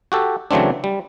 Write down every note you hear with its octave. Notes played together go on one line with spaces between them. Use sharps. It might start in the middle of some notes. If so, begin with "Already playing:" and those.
F#4 G4 A4
C#3 E3 F#3 A3 C4 D4
G3